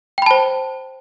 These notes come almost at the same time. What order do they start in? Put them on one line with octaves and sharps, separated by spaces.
G5 B5 A5 C5